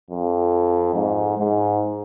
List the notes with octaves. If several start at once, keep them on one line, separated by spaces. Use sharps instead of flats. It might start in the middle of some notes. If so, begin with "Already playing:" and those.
F2
G#2
G#2